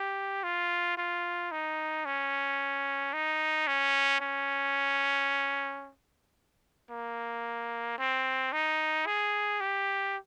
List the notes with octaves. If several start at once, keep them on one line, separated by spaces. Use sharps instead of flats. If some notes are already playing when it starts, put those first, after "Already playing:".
Already playing: G4
F4
F4
D#4
C#4
D#4
C#4
C#4
A#3
C4
D#4
G#4
G4